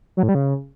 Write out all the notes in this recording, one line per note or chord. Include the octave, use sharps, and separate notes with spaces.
F#3
A2
G3
C#3